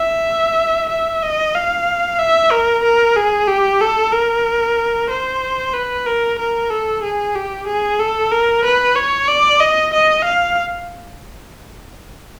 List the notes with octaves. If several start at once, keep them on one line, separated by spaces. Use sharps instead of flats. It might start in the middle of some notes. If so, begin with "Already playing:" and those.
Already playing: E5
E5
D#5
F5
E5
A#4
A#4
G#4
G4
A4
A#4
C5
B4
A#4
A#4
A4
G#4
G4
G#4
A4
A#4
B4
C#5
D5
D#5
D#5
F5